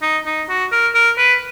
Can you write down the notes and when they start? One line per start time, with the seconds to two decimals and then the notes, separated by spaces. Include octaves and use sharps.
0.02 D#4
0.26 D#4
0.49 F#4
0.72 A#4
0.95 A#4
1.18 B4